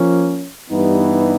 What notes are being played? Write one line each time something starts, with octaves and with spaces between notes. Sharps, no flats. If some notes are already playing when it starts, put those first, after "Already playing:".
Already playing: F3 A#3 C#4
G2 E3 G3 B3 D#4